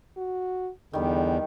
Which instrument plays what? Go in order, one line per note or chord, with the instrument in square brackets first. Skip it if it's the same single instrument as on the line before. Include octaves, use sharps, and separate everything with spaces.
[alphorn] F#4
[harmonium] E2 [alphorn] D3 [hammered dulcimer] D#3 G3